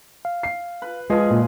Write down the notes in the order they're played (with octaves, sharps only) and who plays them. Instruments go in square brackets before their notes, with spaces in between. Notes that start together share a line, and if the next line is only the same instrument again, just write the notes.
[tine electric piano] F5
[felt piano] C7
[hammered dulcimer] B4
[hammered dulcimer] F3 G#4 [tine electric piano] G#3 F4 D#5 [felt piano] B4
[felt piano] A#2